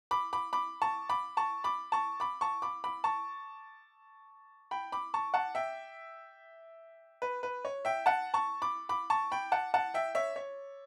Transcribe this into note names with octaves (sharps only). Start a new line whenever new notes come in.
B5 D6
B5 D6
B5 D6
A5 C#6
B5 D6
A5 C#6
B5 D6
A5 C#6
B5 D6
A5 C#6
B5 D6
B5 D6
A5 C#6
G5 B5
B5 D6
A5 C#6
F#5 A5
E5 G5
B4
B4
C#5
E5 G5
F#5 A5
A5 C#6
B5 D6
B5 D6
A5 C#6
G5 B5
F#5 A5
F#5 A5
E5 G5
C#5 E5
C#5